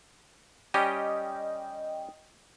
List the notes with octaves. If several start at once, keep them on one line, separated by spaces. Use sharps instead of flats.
G3 C#4 G4 D#5 G5